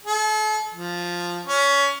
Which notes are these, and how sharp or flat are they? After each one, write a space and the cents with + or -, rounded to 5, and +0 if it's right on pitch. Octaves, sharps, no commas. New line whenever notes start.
A4 -40
F3 +0
C#4 +20